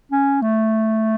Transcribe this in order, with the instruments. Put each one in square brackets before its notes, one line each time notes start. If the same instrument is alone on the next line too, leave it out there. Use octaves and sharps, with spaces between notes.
[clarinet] C#4
A3